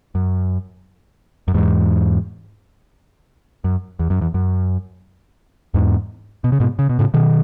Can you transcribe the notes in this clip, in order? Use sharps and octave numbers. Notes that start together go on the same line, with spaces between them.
F#2
F#2
E2 G#2
F#2
E2
F#2
E2
F#2
E2 G#2
B2
C#3
G#2 B2
C#3
B2
A2 C#3
B2 D#3